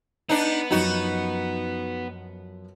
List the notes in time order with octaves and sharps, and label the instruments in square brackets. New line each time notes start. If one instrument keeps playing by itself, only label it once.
[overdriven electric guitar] B3 [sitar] D4 D#4
[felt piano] F#2 F3 [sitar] D#4 F#4